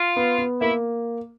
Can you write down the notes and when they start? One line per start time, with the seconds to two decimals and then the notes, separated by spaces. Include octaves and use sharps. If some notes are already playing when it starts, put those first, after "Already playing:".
Already playing: F4
0.16 B3
0.38 B3
0.61 A#3 E4